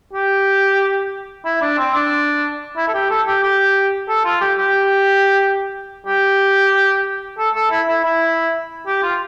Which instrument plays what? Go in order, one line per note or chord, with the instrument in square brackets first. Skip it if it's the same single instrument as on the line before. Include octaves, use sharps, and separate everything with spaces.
[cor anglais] G4
E4
D4
C4
D4
E4
A4
G4
A4
G4
G4
A4
F4
G4
G4
G4
A4
A4
E4
E4
E4
G4
F4